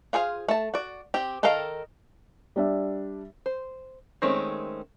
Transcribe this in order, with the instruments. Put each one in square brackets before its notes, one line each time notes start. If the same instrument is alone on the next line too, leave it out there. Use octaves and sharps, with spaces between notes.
[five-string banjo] F4 G#4 C5 F5
A3 A5
F#4 D5
C4 G4
D#3 D#4 A4 A#4 F5
[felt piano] G3 D4 E5
[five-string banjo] C5
D#3 G#3 A3 C4 C#4